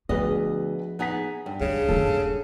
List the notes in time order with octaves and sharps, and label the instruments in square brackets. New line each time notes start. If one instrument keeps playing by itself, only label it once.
[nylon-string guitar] D2 D#5 [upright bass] F3 [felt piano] B3 G#4 B4
[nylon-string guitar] B3 D#4 G#4 [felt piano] F#5 B6
[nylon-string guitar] G2
[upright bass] C#2 [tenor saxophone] C#3
[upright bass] D#1 G2 [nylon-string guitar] A4